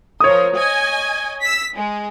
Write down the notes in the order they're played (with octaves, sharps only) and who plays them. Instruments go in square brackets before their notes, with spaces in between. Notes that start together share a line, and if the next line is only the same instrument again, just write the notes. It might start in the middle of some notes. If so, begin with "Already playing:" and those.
[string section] F3 A#4 [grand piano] C#5 D#6
[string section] D#5 G#5
E6 B6
G#3